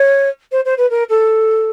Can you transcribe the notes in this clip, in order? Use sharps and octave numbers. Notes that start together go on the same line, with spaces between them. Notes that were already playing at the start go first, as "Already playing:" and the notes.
Already playing: C#5
C5
C5
B4
A#4
A4